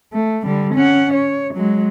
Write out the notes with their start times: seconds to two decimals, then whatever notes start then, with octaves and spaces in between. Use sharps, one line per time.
0.13 A3
0.44 D3 G3
0.75 C#4 F#5
1.14 C#5
1.54 F#3 G#3